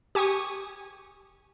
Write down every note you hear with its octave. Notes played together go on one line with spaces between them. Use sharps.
G4 G#5 C#6 D#6